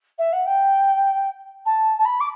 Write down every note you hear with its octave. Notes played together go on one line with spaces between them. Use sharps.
E5
F#5
G5
A5
A5
B5
D6